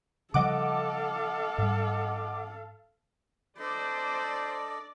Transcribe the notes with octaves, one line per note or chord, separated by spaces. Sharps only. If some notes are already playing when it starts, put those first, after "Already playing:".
C#3 F3 G3 A4 D#5 F5 F#5 D6
G#2 G3
D4 A4 C5 D5 D#5